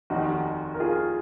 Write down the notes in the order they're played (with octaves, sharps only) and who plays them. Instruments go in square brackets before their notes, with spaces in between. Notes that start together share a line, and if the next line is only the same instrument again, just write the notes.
[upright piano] F1 D#2 D#3 [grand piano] D#4 F#4
[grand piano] A#4
F4 G#4